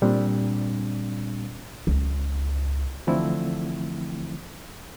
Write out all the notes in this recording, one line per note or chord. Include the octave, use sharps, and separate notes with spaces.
A#2 G3 C4 D4
C#2
D3 E3 F3 A3 C4 E4